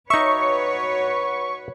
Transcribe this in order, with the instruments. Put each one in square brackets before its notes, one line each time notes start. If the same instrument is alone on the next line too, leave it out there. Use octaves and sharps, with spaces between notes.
[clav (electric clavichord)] D#4 E5 [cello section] F#4 B4 C#5 [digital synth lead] C#6